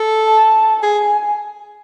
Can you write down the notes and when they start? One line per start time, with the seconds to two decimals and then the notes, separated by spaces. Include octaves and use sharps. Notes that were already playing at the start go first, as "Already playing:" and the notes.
Already playing: A4
0.27 A5
0.82 G#4 G#5